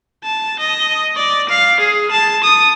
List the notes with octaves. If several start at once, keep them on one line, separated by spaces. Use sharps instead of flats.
A5
D#5
D5
F5
G#4
A5
D#6